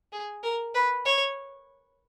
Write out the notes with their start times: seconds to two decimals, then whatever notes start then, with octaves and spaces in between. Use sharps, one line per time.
0.12 G#4
0.43 A#4
0.74 B4
1.05 C#5